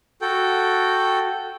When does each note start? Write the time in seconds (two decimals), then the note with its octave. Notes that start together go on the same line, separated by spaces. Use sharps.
0.22 F#4 A4 G5